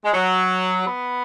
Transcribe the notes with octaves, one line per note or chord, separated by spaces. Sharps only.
G#3
F#3
B3